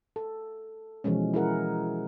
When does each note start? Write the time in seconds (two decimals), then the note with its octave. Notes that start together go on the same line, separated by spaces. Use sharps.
0.16 A4
1.04 B2 E3 F3 G#3 C#4
1.34 E4 G#4 A#4 F#5